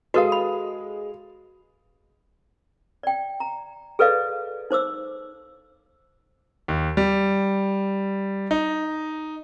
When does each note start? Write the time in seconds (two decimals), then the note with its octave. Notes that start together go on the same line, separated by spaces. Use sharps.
0.14 G#3 F#4 A4 B4 F5 D#6
0.32 B5
3.03 D5 G5
3.40 A#5
3.99 G#4 A4 B4 D5 D#5 F5
4.71 D#4 C5 D6 E6
6.68 D#2
6.97 G3
8.51 D#4